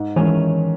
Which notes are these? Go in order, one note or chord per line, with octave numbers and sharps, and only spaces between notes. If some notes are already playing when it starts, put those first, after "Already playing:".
Already playing: G#2
D#3 E3 G#3 C#4